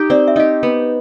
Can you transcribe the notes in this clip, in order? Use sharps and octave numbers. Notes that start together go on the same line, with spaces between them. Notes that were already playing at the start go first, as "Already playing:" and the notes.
Already playing: D#4 G4
C4 D5
E5
D#4 G4 D#5
B3